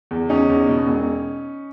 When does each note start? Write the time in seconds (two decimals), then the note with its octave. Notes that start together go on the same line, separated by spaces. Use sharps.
0.11 E2
0.29 E2 C#4 D#4
0.49 E2
0.69 B2
0.86 E1